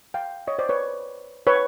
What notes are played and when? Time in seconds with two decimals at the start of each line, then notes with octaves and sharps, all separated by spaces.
0.14 F5 G5
0.47 C#5 D#5
0.59 C5 D5
0.69 B4 C#5
1.47 B4 C#5